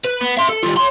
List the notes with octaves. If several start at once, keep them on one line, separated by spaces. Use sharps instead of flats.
B4
B3
E5 C6
A4
G3 F4
C#5 C6